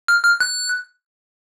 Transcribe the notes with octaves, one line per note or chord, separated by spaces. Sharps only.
F6
F6
F#6